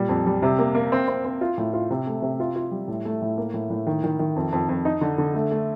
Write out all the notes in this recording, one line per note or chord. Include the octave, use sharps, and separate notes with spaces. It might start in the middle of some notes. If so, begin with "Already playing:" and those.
Already playing: A#2 G3
F2
G3
C3
A#3
A#3
C4
C4
C4
F4
A2
F4
C3
A3
C3
F4
F4
G3
A2
A3
A2
A#3
A2
A2
D#3
D#3
D#3
F2
F2
F2
D#4
D3
D3
A3
A3